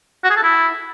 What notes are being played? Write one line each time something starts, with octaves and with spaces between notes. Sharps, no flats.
F#4
G#4
A4
E4